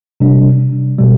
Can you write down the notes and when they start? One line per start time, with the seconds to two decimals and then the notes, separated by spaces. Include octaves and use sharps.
0.20 C3 G3 D4
0.99 B2 G3